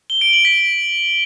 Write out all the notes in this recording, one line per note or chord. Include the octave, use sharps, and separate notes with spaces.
G7
D7
F#7
B6